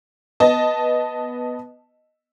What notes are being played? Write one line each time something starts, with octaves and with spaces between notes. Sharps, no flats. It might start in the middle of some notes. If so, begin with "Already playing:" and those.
B3 D#5 A5